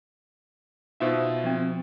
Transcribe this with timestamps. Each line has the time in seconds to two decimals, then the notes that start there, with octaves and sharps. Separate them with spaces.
1.00 B2 D#4 F4 C5 E5
1.44 F3 C4